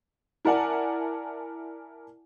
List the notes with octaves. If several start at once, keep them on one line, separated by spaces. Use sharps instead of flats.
E4 A#4 D5 F#5 G#5 A5